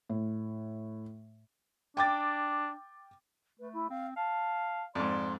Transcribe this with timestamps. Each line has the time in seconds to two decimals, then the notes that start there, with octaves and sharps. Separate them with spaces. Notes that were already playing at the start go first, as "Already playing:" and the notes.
0.09 A2
1.97 D4 G5 D6 A6
3.59 A3 B4
3.73 E4
3.90 C4 F5
4.16 F5 A5
4.95 F2 G#2 D5 C6